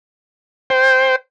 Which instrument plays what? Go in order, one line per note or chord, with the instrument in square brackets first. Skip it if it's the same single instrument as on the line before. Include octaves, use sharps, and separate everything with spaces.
[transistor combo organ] C5 G5